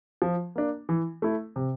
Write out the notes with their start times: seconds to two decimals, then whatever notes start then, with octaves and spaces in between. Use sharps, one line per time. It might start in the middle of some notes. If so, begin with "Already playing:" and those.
0.22 F3
0.56 A#3 D4
0.89 E3
1.22 A3 E4
1.56 C3